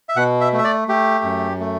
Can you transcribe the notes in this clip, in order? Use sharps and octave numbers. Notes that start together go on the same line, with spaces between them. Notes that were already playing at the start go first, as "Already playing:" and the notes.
E5
B2 F#5
E5
A3
E5
D5
A3 G4
F#2
A3